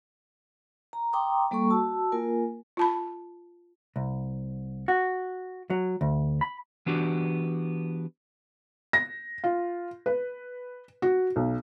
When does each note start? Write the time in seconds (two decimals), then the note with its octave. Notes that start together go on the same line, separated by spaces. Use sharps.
0.93 A#5
1.13 G5 A#5 C6 D6 D#6
1.51 G3 A#3 A4 C#6
1.70 F#4 A5 E6
2.12 A#3 F4 A#4 G#5
2.77 F4 A5 B5
3.96 C2
4.88 F#4
5.70 F#3
6.01 D2
6.41 B5
6.86 E3 B3 D4 F#4 G4
8.93 A#6
9.44 F4
10.06 B4
11.02 F#4
11.36 B1